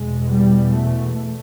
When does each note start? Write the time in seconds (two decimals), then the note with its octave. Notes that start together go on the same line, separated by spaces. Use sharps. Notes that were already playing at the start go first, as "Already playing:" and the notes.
Already playing: E2 B2 G#3
0.30 G3
0.70 A3
1.12 A3